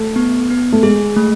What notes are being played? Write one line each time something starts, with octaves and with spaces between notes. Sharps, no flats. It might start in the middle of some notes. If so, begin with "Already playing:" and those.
Already playing: A3
B3
B3
A3
G#3 G#4
A3